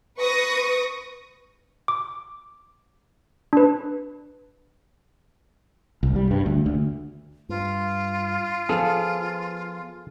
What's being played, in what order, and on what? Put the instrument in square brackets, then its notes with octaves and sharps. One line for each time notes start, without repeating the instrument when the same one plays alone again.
[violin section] B4 C#6 D#6 A#6
[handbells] D6
D4 B4
[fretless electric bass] C2
G3
G2
D2
D2
[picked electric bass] G2 [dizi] F4
[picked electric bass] F3 B3 [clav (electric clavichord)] G#4 A4 F5